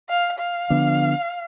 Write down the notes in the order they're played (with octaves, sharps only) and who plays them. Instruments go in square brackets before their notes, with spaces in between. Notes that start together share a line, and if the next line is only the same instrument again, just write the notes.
[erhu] F5
F5
[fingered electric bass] D3 F3 B3 D4